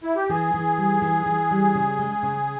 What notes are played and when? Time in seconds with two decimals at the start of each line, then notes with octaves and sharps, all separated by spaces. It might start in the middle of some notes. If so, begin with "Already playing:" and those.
0.03 E4
0.16 G4
0.29 E3 G#4
0.54 E3
0.78 G3
1.02 E3
1.26 E3
1.51 G3
1.75 C#3
1.99 G#3
2.23 C#3